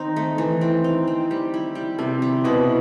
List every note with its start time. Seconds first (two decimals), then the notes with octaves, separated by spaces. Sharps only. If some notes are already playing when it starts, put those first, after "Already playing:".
Already playing: D#3 C4 D#4
0.16 A3
0.38 E3
0.61 C4
0.84 D#4
1.07 C4
1.31 G3
1.54 E4
1.75 G3
1.99 C3 C4
2.22 G3
2.44 B2 E4